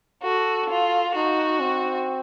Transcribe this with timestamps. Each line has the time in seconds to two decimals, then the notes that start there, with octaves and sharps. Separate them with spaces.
0.23 F#4 A4
0.69 F4
1.14 D#4 F#4
1.60 C4